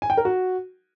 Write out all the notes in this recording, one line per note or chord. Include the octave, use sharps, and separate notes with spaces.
G#5
G5
A#4
F#4